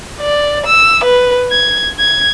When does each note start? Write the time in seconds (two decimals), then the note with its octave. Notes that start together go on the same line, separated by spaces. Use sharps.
0.20 D5
0.66 E6
1.04 B4
1.51 G#6
1.99 G#6